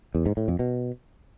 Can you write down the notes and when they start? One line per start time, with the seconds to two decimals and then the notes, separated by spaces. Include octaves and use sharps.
0.15 E2
0.26 G#2
0.37 A2
0.48 F2
0.59 B2